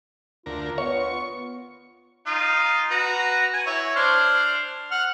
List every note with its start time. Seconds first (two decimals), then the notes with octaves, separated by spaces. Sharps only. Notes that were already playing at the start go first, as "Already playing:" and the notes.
0.46 D2 F4 A#4
0.78 B3 C#5 C#6
2.26 D#4 F4
2.91 F#4 B4 A#5
3.53 G#5
3.66 E4 C#5
3.96 D4 C5 F6
4.91 F#5 F6